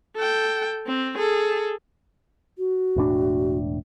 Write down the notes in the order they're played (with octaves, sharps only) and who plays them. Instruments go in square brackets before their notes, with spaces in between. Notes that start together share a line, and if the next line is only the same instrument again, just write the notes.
[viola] A4 G5
C4
G#4 A4
[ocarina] F#4
[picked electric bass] E1 A2 D4